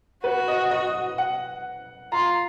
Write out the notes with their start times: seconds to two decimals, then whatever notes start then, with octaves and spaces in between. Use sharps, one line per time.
0.24 F#4 B4
0.48 D#5
0.71 D#5
1.18 F#5
2.12 F4 A#5